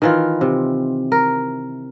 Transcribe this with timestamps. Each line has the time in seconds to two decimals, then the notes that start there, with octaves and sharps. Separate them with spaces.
0.02 D#3 E3 F4
0.41 C3
1.12 A#4